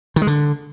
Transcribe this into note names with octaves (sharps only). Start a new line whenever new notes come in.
D#3
G#3
D3